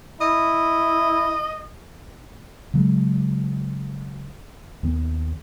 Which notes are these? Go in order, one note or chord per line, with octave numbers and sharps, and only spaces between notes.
E4 D#5
C#3 F#3 G#3
D#2 D#3 B3